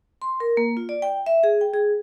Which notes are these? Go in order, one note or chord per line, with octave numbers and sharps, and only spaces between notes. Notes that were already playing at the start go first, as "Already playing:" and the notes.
C6
A#4
A#3
F4
D5
G5
E5
G#4
G5
G#4